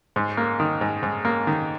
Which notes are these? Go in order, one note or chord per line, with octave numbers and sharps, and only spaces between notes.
G#2
A#3
D#3
G#2
G#2
A#3
D#3